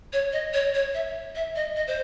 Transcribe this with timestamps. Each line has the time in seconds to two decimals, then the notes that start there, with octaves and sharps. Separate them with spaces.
0.13 C#5
0.33 D#5
0.54 C#5
0.74 C#5
0.94 E5
1.35 E5
1.56 D#5
1.76 D#5
1.87 C5